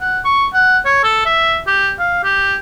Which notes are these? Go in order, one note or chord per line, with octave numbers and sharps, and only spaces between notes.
F#5
C#6
F#5
C#5
A4
E5
G4
F5
G4